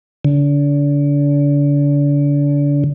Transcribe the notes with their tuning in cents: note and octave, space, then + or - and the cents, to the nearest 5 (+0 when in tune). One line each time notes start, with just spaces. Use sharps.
D3 -35